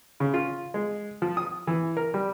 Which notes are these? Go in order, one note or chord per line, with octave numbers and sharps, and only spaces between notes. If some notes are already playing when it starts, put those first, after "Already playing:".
C#3
F4
G#3
F3
D#6
E3
A#4
G3